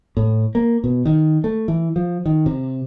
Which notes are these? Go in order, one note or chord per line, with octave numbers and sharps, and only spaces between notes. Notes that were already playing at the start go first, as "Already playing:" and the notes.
A2
A#3
B2
D#3
A3
E3
F3
D#3
C3